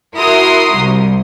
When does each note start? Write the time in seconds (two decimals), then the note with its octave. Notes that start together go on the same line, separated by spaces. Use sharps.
0.16 E4 F#4 A#4 C6 D#6
0.75 C2